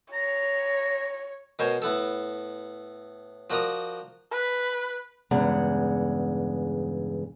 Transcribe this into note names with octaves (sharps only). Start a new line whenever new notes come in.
C#5 A#5
B2 A#4 C5 C#5 G#5
A2 B3 A4
F3 F#4 A#4 D5 A#5 D#6
B4
E2 G2 C#3 G#3 F#5